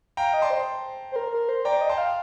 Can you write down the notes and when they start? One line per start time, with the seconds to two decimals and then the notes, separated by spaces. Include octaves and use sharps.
0.17 F5 G5 A#5
0.34 D#5
0.42 D5 A5 C6
0.50 C5
1.12 C5
1.16 A#4
1.32 A#4
1.49 C5
1.65 D5 G5 A#5
1.81 D#5
1.89 G5 A5 C6
1.98 F5